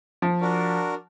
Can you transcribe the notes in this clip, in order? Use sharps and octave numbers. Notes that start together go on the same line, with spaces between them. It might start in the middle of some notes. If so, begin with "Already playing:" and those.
F3
D4 F#4 A#4